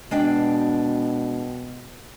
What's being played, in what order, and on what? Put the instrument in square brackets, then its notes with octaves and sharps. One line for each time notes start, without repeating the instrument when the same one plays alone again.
[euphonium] B2 [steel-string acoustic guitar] G#3 D4 G5